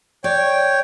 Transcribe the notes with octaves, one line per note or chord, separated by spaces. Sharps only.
C#5 D5 G5